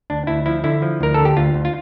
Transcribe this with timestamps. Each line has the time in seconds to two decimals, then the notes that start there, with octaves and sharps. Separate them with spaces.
0.10 D2 D4
0.27 D2 E4
0.46 F3 E4
0.64 D3 E4
0.82 F3
1.01 D2 A#4
1.14 D3 A4
1.25 G4
1.37 D2 F4
1.54 D2
1.65 F4